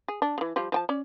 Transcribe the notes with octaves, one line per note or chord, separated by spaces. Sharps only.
G#4
D4
C#3 E3
F3 G3 F4
F3 G5 A5
C#4 D5